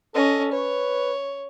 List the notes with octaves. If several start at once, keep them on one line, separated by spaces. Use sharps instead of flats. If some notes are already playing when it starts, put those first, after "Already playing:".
C#4 A4 D#5
B4 C#5